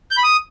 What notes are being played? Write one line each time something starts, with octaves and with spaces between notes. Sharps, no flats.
G6
B5
D#6